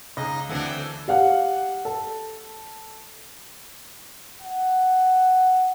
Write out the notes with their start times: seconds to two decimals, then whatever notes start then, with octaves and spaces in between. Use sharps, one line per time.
0.17 C#2 D#4 D#5
0.49 D2 E3 C4 D4 A4 F#5
0.78 A4
1.08 G4 F5 F#5
1.85 A4
4.41 F#5